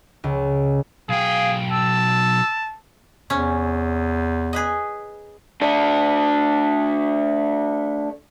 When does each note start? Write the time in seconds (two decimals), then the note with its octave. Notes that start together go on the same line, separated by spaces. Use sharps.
0.24 C#2
1.09 B1 G#4 F5 G5
1.70 A5 E6
3.30 E2 C3 C#4
4.53 G#4 B4 D#5
5.61 A3 D4